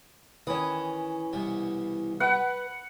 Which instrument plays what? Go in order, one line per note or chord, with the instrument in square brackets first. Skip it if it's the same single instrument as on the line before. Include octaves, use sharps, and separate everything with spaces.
[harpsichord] D#3 D#6 [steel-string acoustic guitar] E3 C#4
[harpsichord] C2 B2
[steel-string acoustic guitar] B4 [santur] F#5